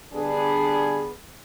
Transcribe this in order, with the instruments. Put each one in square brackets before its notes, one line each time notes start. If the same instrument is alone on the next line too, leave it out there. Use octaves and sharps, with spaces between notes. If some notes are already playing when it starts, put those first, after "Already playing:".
[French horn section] D3 G3 B3 D4 G#4